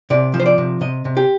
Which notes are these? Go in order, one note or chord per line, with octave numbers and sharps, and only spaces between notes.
C3 D5
F3
C5
D5
C3
C3 D#5
C3
G4